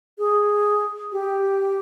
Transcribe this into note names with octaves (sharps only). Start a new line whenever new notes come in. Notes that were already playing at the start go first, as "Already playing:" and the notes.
G#4
G4